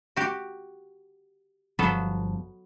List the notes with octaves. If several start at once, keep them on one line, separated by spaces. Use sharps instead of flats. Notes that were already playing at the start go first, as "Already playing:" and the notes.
F#4 G4
G1 F3 F#3 B3 A4